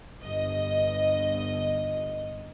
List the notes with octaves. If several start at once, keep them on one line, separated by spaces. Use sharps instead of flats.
G1 D#5